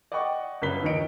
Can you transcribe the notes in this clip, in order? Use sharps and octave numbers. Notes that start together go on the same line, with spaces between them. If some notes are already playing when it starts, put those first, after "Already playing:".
D5 D#5 F#5 G5 C#6
G1 F#2 C#3 B4 B6 G7
D#2 D#3 F3 D#5 C#7 D7